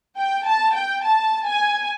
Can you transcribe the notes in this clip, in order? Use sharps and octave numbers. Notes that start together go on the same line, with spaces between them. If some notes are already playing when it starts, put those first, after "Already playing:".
G5
A5
G5
A5
G#5